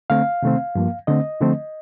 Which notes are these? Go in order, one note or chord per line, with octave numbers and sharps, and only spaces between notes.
D3 A3 C4 F5
C3 D#3 A3 C4
G2 F3 A#3
D3 A3 C4 D#5
D3 F3 A3 C4